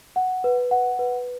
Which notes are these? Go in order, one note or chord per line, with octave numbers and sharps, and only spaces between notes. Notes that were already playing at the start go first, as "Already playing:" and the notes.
F#5
B4
F#5
B4